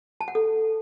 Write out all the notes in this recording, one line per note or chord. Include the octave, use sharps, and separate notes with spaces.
A5
F#5
A4